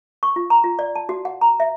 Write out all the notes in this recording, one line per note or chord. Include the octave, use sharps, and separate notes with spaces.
C#6
F4
A#5
F4
D5
A5
F#4
F#5
A#5
E5